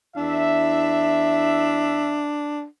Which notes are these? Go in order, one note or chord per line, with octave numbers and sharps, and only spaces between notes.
E2 D4 E4 E5